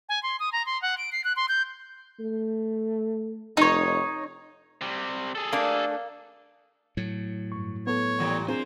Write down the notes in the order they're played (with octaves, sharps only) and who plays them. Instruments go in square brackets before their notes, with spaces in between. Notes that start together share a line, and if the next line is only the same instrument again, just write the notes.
[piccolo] G#5
C6
D#6
A#5
C6
F#5
D7
C7
F#6
C6
G6
[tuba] A3
[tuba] F1 [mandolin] D#4 C#5
[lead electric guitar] C3 G3
G#4 A4
[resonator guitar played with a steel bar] A3 D4 [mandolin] A#3
[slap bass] A2 F#3
[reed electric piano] G2 C#6
[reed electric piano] B3 A4 [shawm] C#5
[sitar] A#2 E3 G3
[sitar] A#3 F4 C5 [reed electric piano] C4 D4 G#4